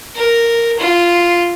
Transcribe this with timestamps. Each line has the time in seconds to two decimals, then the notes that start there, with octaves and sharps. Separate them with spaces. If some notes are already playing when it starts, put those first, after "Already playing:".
0.16 A#4
0.79 F4